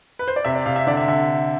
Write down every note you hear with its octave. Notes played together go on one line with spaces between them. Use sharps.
B4
C5
D5
C3 E5
D5
C3 F5
E5
D3 D5
E5
D3 E5